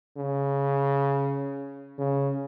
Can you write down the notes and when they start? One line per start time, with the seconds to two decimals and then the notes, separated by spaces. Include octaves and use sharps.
0.17 C#3
1.98 C#3